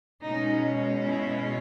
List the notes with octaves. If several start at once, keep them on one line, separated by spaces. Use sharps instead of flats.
B2 G#3 C#4 D#4
E4